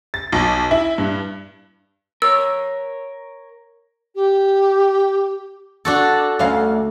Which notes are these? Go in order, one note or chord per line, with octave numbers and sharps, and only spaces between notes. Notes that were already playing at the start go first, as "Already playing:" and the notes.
A6
B1
E4
G2
A#4 C#5 E6
G4
D4 F#4 A4
D2 C#4 F5